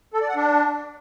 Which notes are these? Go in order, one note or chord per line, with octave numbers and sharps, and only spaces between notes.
A4
D5
F#5
D4